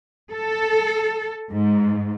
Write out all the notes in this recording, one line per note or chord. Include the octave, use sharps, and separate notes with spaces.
A4
G#2